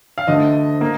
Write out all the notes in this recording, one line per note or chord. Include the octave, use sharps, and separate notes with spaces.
F5
D2 D3 A3 D#5
A#3